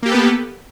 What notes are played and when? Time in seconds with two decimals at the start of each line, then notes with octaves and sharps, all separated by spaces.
0.03 A#3
0.06 G4
0.08 A4
0.11 B4
0.14 B3